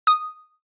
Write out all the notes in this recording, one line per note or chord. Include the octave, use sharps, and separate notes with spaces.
D#6